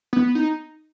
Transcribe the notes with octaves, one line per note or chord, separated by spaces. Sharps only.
B3
D#4